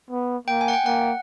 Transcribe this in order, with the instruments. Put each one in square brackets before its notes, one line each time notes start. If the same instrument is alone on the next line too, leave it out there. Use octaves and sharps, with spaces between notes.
[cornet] B3
[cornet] A#3 [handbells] G5
[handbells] G#5
F#5
G5
[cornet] A#3 [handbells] F#5